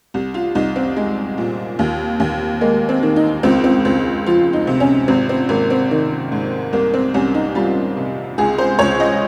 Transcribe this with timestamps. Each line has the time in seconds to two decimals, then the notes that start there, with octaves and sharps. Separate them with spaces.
0.14 C2
0.34 F4
0.55 C2 D#4
0.76 C4
0.96 G#3
1.38 A#2
1.79 D#2
2.20 D#2
2.61 G#3 A#3
2.89 C4
3.03 D#3
3.16 D#4
3.43 C#2 C4
3.64 C4
3.85 C#2 C4
4.26 F3 F4
4.53 D#4
4.67 C3
4.80 C#4
5.08 G#1 C4
5.29 C4
5.49 G#1 A#3
5.70 C4
5.91 D#3
6.32 G#2
6.73 C2 A#3
6.94 C4
7.14 C2 C#4
7.34 D#4
7.55 G3 F4
7.97 C3
8.38 C#2 G#4
8.58 C5
8.79 C#2 C#5
9.00 D#5